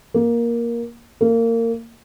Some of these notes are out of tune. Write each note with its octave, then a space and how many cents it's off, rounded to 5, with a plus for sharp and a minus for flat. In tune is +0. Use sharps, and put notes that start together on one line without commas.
A#3 +10
A#3 -25